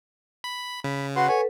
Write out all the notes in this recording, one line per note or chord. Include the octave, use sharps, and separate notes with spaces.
B5
C#3 B5
F#4 B4 F#5 C6
A4 B4 C#5 G#5